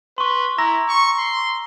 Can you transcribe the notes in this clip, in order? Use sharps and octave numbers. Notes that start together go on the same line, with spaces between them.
B4 C6 C#6
E4 A#5 E6 A#6
C#6
C6